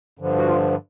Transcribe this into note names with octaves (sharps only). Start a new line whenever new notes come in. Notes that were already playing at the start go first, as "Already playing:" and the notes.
G2 D3 F3
F#4
F4